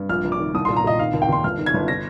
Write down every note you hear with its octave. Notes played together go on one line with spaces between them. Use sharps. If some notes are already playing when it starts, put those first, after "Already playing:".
Already playing: G2
A#1 F6
A#1
D6
D#3
C2 D#6
A#2 C6
A#5
A#2 D#5
D#3 F5
D#2
G5
D#2 C6
G1 F6
D#3
G#6
G1
A#6